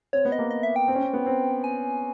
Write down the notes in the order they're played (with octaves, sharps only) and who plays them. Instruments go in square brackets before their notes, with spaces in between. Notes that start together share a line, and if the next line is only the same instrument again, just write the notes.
[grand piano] C4 [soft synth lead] C#5
[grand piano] B3
[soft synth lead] D#5
[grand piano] A#3
[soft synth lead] D#5
E5
G5
[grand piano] C4
C#4
C4
B3
C4
[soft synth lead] G#5